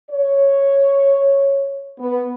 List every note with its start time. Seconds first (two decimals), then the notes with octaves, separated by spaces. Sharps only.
0.10 C#5
1.99 B3